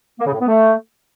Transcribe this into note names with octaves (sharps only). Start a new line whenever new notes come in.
A#3
C#3
A2
B3
A3